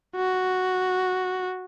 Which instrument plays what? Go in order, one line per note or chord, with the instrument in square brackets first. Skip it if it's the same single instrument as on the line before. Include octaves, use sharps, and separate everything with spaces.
[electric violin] F#4